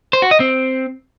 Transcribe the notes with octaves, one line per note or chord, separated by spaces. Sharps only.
C5
F#4
D#5
C4